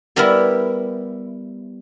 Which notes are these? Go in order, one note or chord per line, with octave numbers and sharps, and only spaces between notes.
G3 B3 E4 G4 A#4